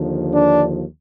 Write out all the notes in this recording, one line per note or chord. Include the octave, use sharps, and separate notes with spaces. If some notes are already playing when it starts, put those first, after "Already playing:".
Already playing: D#2 D3 F3
D4